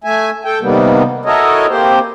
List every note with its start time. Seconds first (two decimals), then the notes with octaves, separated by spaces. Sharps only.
0.04 A3 E5 G#5
0.45 A4 G5
0.61 C3 D#3 G3 A#3 B3
1.25 E4 F#4 A4 A#4 C#5 D#5
1.69 A#3 C4 G4 C5